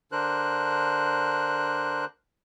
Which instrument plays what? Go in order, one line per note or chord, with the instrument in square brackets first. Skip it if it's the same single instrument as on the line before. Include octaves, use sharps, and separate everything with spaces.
[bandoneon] D3 D4 A#4 C5 F#6